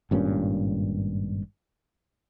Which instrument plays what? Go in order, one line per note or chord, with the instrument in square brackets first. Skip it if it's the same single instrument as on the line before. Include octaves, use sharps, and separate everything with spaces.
[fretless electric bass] G#1 G2 A#2 C#4